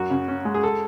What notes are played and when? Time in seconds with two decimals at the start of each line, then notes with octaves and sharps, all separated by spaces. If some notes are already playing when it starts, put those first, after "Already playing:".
Already playing: F#2 F#4
0.10 C#3
0.28 C#4
0.45 G#3
0.54 G#4
0.63 A4